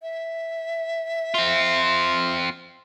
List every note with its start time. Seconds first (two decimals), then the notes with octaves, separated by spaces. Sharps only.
0.02 E5
1.34 C4 F4